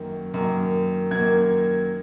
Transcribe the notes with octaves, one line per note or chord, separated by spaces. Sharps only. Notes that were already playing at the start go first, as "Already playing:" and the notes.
Already playing: F#2 D#3 A#3
F#2 D#3 A#3
F#2 D#3 A#3 G#6